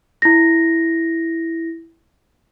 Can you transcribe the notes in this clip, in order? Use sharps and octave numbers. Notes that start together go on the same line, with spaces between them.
E4 A#6